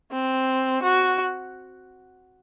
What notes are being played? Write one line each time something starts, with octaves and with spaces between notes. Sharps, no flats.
C4
F#4